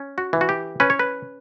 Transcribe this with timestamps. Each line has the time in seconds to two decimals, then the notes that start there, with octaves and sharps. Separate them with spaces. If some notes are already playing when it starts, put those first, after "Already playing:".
Already playing: C#4
0.18 F#4
0.33 E3
0.41 F#4
0.49 G4
0.80 C#4 B4
0.90 C#5
0.99 B4